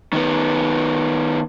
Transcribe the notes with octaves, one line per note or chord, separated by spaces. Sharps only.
D#3 B3